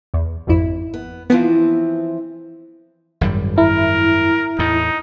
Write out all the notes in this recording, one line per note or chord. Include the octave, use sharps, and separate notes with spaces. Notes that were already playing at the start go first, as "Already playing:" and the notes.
E2
G#1 F2 E4
B3
E3 F3 B3 C4 F4
G#1 F#2 G3
E4 A#4
E2 A2 D#4